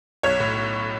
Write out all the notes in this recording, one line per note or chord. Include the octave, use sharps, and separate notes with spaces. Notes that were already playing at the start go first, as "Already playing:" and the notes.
B1 C#5
A2